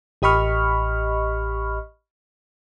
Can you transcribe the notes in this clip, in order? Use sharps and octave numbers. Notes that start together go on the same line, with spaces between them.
A1 G4 D#5 B5 C#6 F6